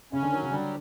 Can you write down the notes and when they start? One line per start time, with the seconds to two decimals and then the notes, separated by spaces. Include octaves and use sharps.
0.13 C#3 C#4
0.23 D3
0.32 D#3 F#3
0.42 C#3
0.51 D3 G3